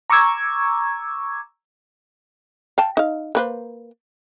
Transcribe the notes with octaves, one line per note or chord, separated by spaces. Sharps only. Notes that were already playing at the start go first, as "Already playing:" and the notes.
A#5 C#6 D6 E6 G#6
F5 G5 A5
D#4 F5
A#3 B4 C5